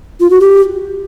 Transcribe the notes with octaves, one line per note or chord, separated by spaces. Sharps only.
F4
F#4
G4